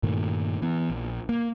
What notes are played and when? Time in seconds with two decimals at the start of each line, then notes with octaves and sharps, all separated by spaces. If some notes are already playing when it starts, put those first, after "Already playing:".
0.03 G2 A#2 D#3 A3
0.62 E3 B3
0.90 A#1
1.29 A#3